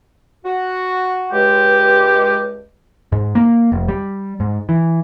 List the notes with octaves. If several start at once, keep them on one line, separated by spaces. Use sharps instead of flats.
F#4
C#2 G2 G#3 G4
G#2
A#3
F1
G3
G#2
E3